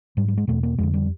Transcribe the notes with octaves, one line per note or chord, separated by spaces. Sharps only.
G#2 G3
G3
G#3
E2 B2 A3
A#3
F2 D3 G#3
G3